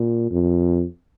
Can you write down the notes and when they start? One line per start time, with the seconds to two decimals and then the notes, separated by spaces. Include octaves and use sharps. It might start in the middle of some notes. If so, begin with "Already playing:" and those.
Already playing: A#2
0.31 F2